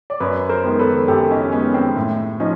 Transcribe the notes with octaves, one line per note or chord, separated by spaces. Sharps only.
D5
F#2 B4 C#5
A#4 C5
D#3 G#3 B3
A4 B4
F#2 G4 A4
C#4 D#4
D#3 G#3 B3 C#4
C4
A2
F3 C#4 D#4